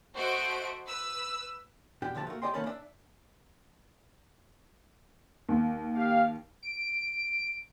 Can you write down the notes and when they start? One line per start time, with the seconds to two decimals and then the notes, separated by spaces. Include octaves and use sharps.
0.15 A3 F#4 C5 D#5 D7
0.86 B4 E6
2.02 E2 B2 D4 G4 G5
2.15 D2 D3 F3 G4 A5
2.27 A3 A#3 F#4
2.42 C2 G4 D5 D#5 G5 C6
2.54 C2 D#3 A#3 C#4 A4 B5
2.66 D4 D5 E5
5.49 D#2
5.95 G4 F5
6.63 D7